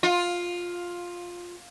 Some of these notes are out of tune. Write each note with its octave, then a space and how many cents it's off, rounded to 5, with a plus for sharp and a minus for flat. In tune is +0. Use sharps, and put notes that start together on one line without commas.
F4 +10